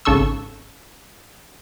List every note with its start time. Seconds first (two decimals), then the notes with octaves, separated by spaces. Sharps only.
0.05 G#1 C#3 A4 C#6 E6